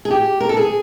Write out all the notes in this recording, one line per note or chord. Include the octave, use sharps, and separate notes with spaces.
G#4
G4
A#4
A4
G#4